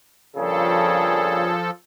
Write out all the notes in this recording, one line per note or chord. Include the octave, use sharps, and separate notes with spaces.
G2 A#2 C#3 F3 G#4 A4